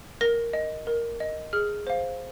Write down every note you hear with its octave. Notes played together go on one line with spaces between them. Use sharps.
A#4 A#6
D#5
A#4
D#5
G#4 F6
C5 F5